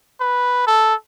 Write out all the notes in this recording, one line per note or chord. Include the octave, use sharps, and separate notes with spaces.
B4
A4